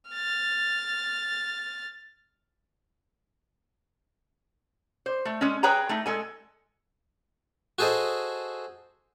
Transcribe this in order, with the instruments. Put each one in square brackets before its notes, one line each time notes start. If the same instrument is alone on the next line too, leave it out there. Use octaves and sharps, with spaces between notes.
[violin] F6 A6
[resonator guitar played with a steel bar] C5
A3
G#3 C#4
G#4 B4 C#5 G5 G#5 A#5
A3 D#4
G#3 A4 G#5
[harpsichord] F#4 G#4 A4 C5 D#5